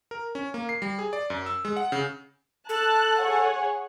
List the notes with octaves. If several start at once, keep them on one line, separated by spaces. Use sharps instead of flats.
A#4
C#4
A#3
C7
G3
G#4
D5
F#2
E6
G#3
F#5
C#3
A4 A5 F#6
G#4 C#5 F#5